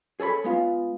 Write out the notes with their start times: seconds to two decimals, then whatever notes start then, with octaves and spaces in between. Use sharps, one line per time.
0.20 G#4 A4 C#5 B5
0.44 G#3 B3 F4